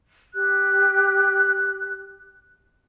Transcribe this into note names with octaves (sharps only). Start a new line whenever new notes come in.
G4 F#6